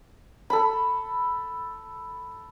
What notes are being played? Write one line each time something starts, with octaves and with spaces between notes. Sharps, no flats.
A4 B5